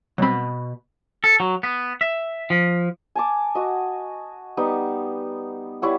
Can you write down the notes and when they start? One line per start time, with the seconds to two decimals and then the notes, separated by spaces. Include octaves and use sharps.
0.18 B2 F#3 G3 C4 B5
1.24 A4
1.40 F#3
1.63 B3
2.01 E5
2.50 F3
3.15 G#5 A5 D6
3.55 F#4 D#5
4.57 G3 B3 D#4
5.82 G3 E4 C#5 F#5